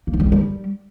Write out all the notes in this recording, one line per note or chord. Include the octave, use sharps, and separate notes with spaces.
A#3
D#4
G3
C4
G3